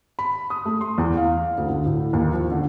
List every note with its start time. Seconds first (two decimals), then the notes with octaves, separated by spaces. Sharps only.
0.19 B5
0.50 D#6
0.66 A3
0.81 C6
0.98 E2
1.17 F5
1.58 D2
1.69 D3
1.86 A2
2.13 D#2
2.33 F3
2.52 D3